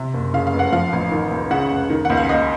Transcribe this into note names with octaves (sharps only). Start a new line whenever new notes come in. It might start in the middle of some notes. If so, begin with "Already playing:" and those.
Already playing: C3
F#1
C#3 F5
F5
F1
F#5
F3 F5
A1
D#3
C#2
C#3 F#5
F1
D#3
C#2 F#5
F5
D#2 D#5